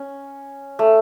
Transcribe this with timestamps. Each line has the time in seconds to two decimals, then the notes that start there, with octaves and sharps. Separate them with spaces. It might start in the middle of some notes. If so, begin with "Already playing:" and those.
Already playing: C#4
0.79 A3